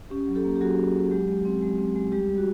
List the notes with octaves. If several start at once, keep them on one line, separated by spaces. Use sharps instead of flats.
C#4 G4
F#3
G4 A4
A#3
G4
F#3 F#4 G#4
F#3
F#3
G#3 G4
G#3
C4
G#3
C4
G#3
G3 G4
G3
F#4